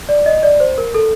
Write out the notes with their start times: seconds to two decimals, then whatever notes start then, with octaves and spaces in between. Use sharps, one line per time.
0.09 D5
0.26 D#5
0.43 D5
0.60 C5
0.78 A#4
0.94 A4